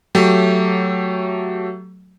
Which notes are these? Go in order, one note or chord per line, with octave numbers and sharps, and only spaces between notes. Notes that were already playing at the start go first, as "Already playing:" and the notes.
F#3 A3 G4